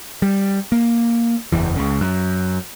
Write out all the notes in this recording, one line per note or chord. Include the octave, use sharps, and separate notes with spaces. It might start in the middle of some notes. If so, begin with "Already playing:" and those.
G3
A#3
F#1 E2 E3
C#2 C#3
F#2